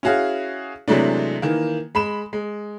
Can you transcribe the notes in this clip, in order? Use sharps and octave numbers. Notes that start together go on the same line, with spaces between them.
C#4 E4 F#4 G#4 F5
C3 E3 F#3 G#3 A3 D4
D#3 E3 A#3
G#3 B5 E7
G#3